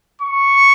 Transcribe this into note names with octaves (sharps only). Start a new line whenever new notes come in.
C#6